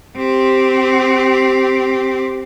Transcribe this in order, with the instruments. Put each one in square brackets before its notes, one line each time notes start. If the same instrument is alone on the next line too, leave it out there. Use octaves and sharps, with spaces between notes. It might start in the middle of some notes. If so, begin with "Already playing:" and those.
[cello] C4 G4